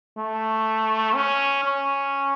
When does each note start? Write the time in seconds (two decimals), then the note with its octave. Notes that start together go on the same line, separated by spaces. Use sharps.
0.18 A3
1.15 C#4
1.64 C#4